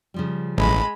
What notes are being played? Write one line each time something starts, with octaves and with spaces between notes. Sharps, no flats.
C#3 F3 G3
A1 G#3 B5